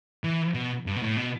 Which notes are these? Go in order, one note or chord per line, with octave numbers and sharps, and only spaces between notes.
E3
B2
G2
B2
A2
B2